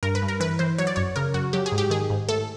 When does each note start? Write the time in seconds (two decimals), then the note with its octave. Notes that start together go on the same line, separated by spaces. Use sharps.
0.03 G2 A#4
0.15 B4
0.22 G2
0.28 A#4
0.40 E3 B4
0.59 E3 C5
0.78 F#3 C#5
0.87 D5
0.96 F#2 C#5
1.16 C#3 A#4
1.34 F#2 F#4
1.53 F#3 G4
1.66 G#4
1.72 G#2
1.78 G4
1.90 D#3 G#4
2.10 G#2
2.28 A2 A4